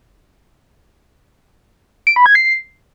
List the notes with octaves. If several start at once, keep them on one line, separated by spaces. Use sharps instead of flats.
D7
B5
G#6
C7